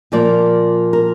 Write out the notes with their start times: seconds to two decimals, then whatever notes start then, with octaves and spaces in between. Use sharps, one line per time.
0.12 A#2 F3 A#3 D5
0.93 A#4